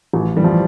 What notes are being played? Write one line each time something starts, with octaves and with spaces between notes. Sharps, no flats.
A1 F3
E3 G3
F3